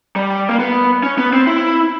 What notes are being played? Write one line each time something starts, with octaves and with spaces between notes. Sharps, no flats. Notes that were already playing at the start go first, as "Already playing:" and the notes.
G3
A#3
B3
C#4
B3
C4
E4